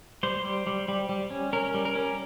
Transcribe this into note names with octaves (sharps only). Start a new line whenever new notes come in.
G3 C5
G3
G3
G3
G3
C#4
C#4 A#4
G3
A#4
C#4